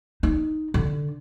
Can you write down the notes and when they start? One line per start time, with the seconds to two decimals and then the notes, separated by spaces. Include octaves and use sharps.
0.23 D#4
0.74 D3